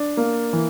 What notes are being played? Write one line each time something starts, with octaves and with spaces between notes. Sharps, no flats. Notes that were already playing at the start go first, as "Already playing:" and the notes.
Already playing: D4
A#3
E3